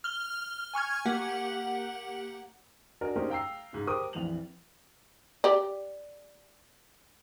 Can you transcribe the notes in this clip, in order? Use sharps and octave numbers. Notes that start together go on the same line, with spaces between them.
F6 G7
G#5 C#6 F6 G#6
A#3 G4 F#5
D4 F#4 A#4 D#5 G#5
A#3 C#4 D#4 G4 A#4 C5
F5 G5 A#5 E6 C7
G#2 C#3
G4 A#4 C5 G5 D6 D#6
A#1 F2 E3 F7 F#7
G4 D5